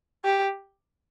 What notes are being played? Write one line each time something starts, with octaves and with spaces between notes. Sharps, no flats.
G4